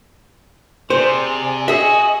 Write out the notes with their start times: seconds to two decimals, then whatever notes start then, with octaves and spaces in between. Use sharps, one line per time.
0.90 C3 G#4 C5 D5
1.68 F#4 G#4 D#5 E5 G#5